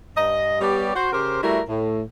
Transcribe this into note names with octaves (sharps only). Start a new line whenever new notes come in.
G2 D#5
G3 B3 G4 C#5 D5
F#4 C5
C#3 G4 A#4 C5
G3 A3 E4 F#4 A#4
A2